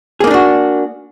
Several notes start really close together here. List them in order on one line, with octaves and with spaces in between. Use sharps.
G#4 A#3 D#4 D4 F#4